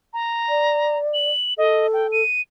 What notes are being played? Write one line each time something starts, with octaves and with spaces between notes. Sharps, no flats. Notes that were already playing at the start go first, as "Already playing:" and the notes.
A#5
D5
F#7
A4 D#5
G5
D#7